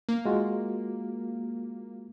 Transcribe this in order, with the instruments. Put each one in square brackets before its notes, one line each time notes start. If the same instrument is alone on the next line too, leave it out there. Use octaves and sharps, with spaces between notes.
[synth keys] A#3
[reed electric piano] G#3 F4 F#4